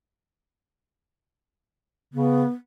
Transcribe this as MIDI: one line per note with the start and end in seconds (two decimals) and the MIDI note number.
2.14 2.44 49
2.14 2.48 59